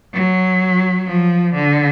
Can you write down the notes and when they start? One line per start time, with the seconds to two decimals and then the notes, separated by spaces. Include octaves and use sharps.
0.13 F#3
1.07 F3
1.55 D3